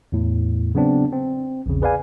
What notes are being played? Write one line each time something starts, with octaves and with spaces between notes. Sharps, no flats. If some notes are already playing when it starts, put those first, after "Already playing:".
E2 A2
C#3 F#3 B3 C4 D4
C4
A#1 E2 C#3
G#4 B4 D5 F5 G#5